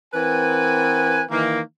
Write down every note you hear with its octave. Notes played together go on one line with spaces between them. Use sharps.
E3 C4 A#4 B4 F#5 G#5
D#3 E3 A#3